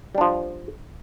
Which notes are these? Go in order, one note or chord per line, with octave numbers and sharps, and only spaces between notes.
F3 G3 D4